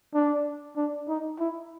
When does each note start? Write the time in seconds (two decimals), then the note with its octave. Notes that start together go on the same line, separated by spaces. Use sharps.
0.14 D4
0.77 D4
1.08 D#4
1.39 E4